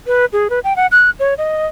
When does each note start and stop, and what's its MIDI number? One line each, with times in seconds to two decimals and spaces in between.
0.07 0.26 71
0.33 0.48 68
0.50 0.60 71
0.64 0.76 79
0.76 0.87 78
0.92 1.10 90
1.20 1.34 73
1.38 1.66 75